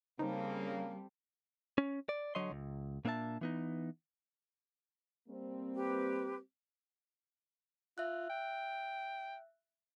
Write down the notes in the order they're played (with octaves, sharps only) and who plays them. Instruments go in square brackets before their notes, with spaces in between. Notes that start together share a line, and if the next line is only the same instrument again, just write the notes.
[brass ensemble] C#3 A#3 [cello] G3 [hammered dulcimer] C4 A4 C5 [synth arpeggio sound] D#4
[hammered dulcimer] G4
[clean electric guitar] C#4
D5
D3 F#3 C#5 D#5 C6
C#2
A#2 A#3 D4 C5 E5 A5
E3 B3 D#4
[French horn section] G3 A#3 C4
[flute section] G4 B4
[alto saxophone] F4 [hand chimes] E5 F#6
[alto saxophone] G5